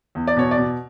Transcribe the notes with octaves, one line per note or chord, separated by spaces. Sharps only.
E2
D5
B2 C#5
D5
B2